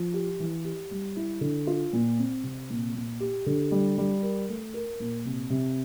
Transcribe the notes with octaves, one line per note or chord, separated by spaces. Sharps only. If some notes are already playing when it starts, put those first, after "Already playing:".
Already playing: F3
G4
E3
G4
G3
E4
D3
F4
A#2
C4
C3
A#2
A#2
G4
D3
G3
G3
A#4
A3
A#4
A#2
C3
C3